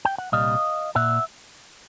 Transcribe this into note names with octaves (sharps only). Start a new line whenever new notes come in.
G5
F#5
C2 A#2 G3 D#5 F5
A#2 E5 F#5